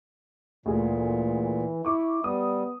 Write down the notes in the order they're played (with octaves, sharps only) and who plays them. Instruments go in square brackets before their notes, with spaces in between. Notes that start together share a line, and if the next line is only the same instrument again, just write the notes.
[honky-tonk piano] D2 G#4 [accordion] A#2 [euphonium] E3
[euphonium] E4 [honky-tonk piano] C#6 D6
[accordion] G3 [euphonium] B3 [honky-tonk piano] D#6